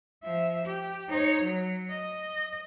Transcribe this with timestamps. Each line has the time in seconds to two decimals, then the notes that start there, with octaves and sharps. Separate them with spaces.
0.23 F3 E5
0.65 G4
1.09 D#4 C#5
1.43 F#3
1.90 D#5